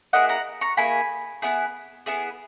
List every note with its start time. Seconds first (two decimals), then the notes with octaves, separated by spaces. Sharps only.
0.13 A#3 E4 G#4 D#5 F#5
0.29 F#5 A#5
0.61 A#5 C#6
0.77 A#3 E4 G#4 G#5 B5
1.42 B3 E4 G#4
2.06 B3 E4 G#4